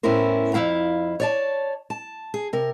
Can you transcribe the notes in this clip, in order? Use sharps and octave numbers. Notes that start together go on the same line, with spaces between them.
A2 B3 C#4 E4 A#4 C5
F2 F#3 E4 F5 A#5
C#5 D5 A5
A5
G#4
C3 A#4